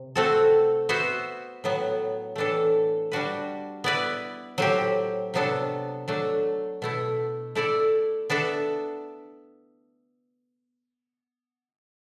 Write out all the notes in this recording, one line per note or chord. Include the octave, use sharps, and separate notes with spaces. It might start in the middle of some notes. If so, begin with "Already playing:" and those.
Already playing: C3
A3 C4 F#4 A4
B3 F#4 C5 E5
A2 F#3 B3
A2 E3 A3 D4 A4
G3 D4 F#4 B4
B3 E4 B4 D5
A2 F#3 C4 G4
C3 F#3 B3 D4 A4
F#3 A3 D4
B2 A3 E4
A3 E4 A4 D5
B3 D4 A4 E5